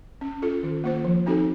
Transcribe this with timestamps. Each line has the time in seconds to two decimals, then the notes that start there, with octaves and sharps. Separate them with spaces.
0.21 C#4
0.42 F4 A4
0.63 D#3
0.84 A#3 F4 C5
1.04 F3
1.26 C4 D#4 F#4 A4